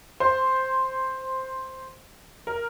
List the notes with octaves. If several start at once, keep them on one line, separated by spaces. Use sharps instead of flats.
C5
A#4